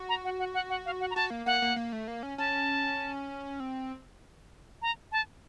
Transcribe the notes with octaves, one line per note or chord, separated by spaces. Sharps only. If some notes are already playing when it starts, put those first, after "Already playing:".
Already playing: F#4
A#5
F#5
F#5
F#5
F#5
F5
F#5
A#5
F#4 A5
A#3
A#3 F#5
A#3
A#3
A3
A#3
C#4
C#4 A5
C4
A#5
A5